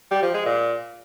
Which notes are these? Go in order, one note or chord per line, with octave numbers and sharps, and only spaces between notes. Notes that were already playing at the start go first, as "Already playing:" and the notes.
G3
F3
G#3
A#2